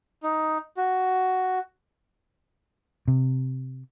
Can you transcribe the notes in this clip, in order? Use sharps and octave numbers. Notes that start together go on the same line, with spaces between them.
D#4
F#4
C3